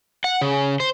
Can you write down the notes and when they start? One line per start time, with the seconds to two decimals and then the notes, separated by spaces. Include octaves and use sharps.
0.24 F#5
0.41 C#3
0.80 C5